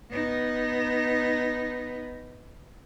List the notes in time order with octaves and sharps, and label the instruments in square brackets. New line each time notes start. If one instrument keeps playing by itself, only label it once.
[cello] B3 D#4